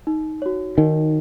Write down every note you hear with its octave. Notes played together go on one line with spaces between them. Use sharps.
D#4
F#4 C#5
D#3 D#4